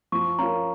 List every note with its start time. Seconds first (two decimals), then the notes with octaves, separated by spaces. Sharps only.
0.12 F3 C#6
0.39 C#4 F4 A#4 A#5